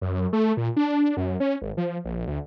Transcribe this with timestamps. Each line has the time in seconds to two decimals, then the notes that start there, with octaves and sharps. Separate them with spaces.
0.01 F#2
0.33 A3
0.57 A#2
0.76 D4
1.17 F#2
1.40 C#4
1.62 G#1
1.77 F3
2.05 A#1
2.27 D2